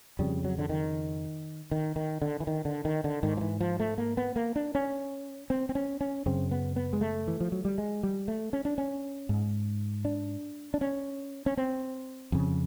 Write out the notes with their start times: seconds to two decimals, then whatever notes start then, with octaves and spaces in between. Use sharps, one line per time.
0.19 F2 C#3 G3
0.45 F#3
0.59 D3
0.69 D#3
1.71 D#3
1.96 D#3
2.22 D3
2.40 E3
2.47 D#3
2.65 D3
2.85 D#3
3.04 D3
3.23 G#2 D#3
3.37 F3
3.41 E3
3.61 F3
3.80 A3
3.98 A#3
4.17 B3
4.36 A#3
4.56 D4
4.75 C#4
5.50 C4
5.69 C4
5.75 C#4
6.01 C#4
6.26 F#2 C#3 C4
6.51 B3
6.76 B3
6.93 G#3
7.01 A3
7.27 E3
7.41 F3
7.52 F#3
7.65 G3
7.78 G#3
8.03 G3
8.28 A3
8.53 C#4
8.65 D4
8.78 C#4
9.29 G#2
10.05 D4
10.74 D4
10.81 C#4
11.46 C#4
11.57 C4
12.32 F2 C#3